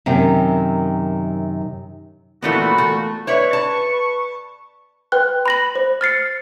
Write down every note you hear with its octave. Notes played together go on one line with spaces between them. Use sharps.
F#2 C3 D#3 G5
A#2 E3 A3 B3 F#4
A3
B4 C#5 D5 E5 C#6
A5
B4 G5 F#6
B5 A#6 F#7
C5
F6 A6 C7 C#7